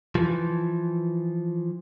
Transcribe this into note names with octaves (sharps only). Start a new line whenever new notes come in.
E3 F3